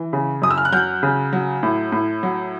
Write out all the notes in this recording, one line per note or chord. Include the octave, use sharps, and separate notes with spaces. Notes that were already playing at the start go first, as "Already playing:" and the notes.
Already playing: E3
C#3
F#2 D#6
E6
F6
F#6
F#3 F6 G6
C#3
F#3
A2
A2
F#3